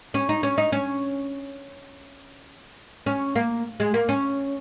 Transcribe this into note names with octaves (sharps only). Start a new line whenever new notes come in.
C#4
D#4
C#4
D#4
C#4
C#4
A#3
G#3
A#3
C#4